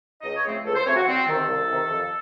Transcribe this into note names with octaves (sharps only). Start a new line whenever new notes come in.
C#2 D#5
C#5
C#3 F3 A3 C4
C#2 A4
C5
C#3 F3 A3 C4 C#5
F#4
C2 C4
C3 D#3 A4
C2
C3 D#3
F2